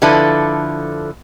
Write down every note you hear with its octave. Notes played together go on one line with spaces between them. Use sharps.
D3 F3 E4 A4 B4